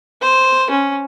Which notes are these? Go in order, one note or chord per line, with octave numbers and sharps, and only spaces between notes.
C5
C#4